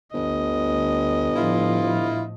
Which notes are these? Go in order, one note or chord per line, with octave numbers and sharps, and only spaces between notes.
G1 D2 D#5
A2 F3 E4 F4